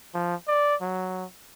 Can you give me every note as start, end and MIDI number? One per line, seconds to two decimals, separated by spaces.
0.14 0.35 53
0.48 0.75 74
0.81 1.25 54